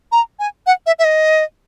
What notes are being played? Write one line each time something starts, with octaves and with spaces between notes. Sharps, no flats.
A#5
G#5
F#5
E5
E5
D#5